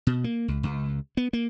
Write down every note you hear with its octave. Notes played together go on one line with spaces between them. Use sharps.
B2
A#3
C#2
C#2
B3
A#3